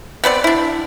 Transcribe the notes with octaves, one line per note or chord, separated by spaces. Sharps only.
B3 C4 B4 D5
D4 E4